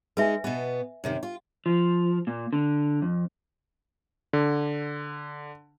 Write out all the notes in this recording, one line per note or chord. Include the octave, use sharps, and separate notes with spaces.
G#3 D#4 B4 E5 G#5
B2 B3
F#2 C3 D#3
F4
F3
A#2
D3
F2
D3